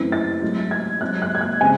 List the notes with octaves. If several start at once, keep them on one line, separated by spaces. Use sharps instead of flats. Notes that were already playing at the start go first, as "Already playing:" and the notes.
Already playing: F#2 E3 A3 C4
A6
G#2 F#3 A3
G#6
G#2 F#3 C4 F#6
F#6
G#6
F#6
C#3 G#3 C4 G#5